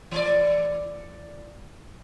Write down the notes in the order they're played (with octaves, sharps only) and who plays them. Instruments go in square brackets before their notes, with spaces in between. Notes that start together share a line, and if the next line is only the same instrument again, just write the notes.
[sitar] E3 A3 D5